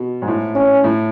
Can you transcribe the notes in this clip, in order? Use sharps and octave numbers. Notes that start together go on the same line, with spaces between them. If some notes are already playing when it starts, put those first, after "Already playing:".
Already playing: B2
G#2
A2
C#4
A2